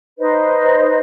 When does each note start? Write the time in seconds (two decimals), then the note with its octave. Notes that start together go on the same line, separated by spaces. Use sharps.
0.18 D#4 B4 C5 D#5